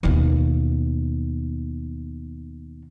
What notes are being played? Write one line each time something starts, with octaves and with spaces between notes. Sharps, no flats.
D#2 B2